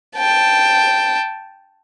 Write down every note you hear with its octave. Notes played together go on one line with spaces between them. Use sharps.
G5 A5